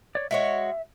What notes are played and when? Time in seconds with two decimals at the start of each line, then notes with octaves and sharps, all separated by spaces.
0.15 C#5 D5
0.31 G#3 F#4 C#5 E5